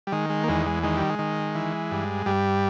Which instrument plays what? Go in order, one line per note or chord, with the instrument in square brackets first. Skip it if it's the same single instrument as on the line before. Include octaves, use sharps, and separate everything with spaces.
[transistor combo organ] G3
D#3 G#3
G#3
A#3
E2 G#3
G#3
D#3 G#3
G3
G#3
D#3
E3
G2
G2 G3